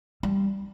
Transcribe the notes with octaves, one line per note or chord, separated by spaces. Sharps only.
G3